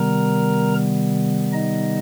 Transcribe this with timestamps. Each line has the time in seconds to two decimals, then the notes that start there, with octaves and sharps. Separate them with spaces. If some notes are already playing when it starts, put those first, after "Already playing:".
Already playing: C3 D#3 G3 B3 A#4 A#5
1.53 D#4 D#5